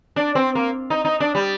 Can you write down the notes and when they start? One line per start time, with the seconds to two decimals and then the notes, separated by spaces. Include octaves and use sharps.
0.16 D4
0.35 C4
0.55 A#3
0.90 D#4
1.05 D#4
1.20 D4
1.35 G3